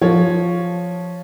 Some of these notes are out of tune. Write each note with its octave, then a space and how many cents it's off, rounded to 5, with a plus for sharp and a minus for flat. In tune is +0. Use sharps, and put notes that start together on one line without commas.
F3 +0 C#5 +0